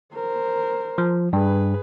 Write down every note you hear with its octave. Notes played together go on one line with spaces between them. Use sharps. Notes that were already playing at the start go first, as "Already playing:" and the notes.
A#4 C5
F3
G2 G#4 B4